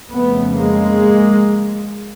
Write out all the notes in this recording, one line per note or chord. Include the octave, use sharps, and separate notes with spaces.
F2 C#3 A3 B3
G#3 A#3